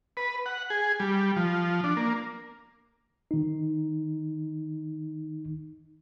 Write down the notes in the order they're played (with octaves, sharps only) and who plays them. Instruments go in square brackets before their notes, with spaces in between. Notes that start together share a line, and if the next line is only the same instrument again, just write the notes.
[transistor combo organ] B4
F#5
G#4
G3
F3
D4
A#3
[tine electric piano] D#3 D#4